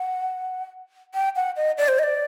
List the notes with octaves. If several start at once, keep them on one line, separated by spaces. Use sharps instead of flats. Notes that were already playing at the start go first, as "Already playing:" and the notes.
Already playing: F#5
G5
F#5
D#5
D5
C5
D#5
D5